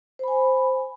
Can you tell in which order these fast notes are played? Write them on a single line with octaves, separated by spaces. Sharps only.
C5 B5 G#5